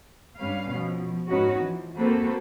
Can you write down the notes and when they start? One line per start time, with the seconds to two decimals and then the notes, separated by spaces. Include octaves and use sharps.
0.37 G2 G3 C#4 B4 F5
0.71 B2 F3
1.29 G#2 C#4 D#4 F#4 B4 C#5
1.58 E3 F3
1.96 A#3 C4 F#4 A4 B4 C5